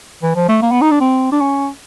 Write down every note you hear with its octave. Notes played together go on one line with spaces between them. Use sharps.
E3
F3
A3
A#3
B3
D#4
D4
C4
D4
C#4